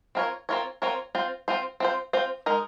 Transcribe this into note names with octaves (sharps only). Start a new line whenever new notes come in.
C4 F4 A#4 C#5
C4 F4 A#4 C#5
C4 F4 A#4 C#5
C4 F4 C5
C4 F4 C5
C4 F4 C5
C4 F4 C5
G#3 D#4 A#4